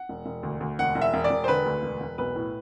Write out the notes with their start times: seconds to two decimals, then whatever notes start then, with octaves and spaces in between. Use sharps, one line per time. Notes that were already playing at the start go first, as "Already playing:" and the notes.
Already playing: F#5
0.09 E1
0.26 E1
0.43 D2
0.60 D2
0.79 E1 F#5
0.95 E1
1.02 E5
1.14 E1
1.24 D5
1.30 E1
1.44 C5
1.48 D3 B4
1.66 D2
1.83 E1
2.01 E1
2.18 B1 B4
2.36 A2